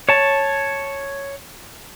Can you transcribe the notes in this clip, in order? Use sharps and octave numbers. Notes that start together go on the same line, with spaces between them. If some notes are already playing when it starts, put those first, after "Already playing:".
C#5 A5